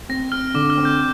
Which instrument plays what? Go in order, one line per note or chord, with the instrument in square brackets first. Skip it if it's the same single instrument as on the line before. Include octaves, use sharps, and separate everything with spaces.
[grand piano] C4 [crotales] A#6
[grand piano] C4 [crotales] F6
[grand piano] D3 [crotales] D6
[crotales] F6
[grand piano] C4
[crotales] G6